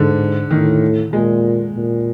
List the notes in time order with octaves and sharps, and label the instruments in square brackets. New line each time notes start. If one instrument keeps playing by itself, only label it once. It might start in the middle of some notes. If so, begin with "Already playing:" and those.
Already playing: [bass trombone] G#2 [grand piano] D3
[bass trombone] A2 [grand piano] D#3
[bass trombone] A#2 [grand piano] G#3
[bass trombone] A#2